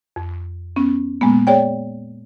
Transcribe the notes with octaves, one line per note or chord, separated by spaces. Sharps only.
F2
B3 C#4
A#2 G#3 A#3 B3
G#4 C#5 D5 G5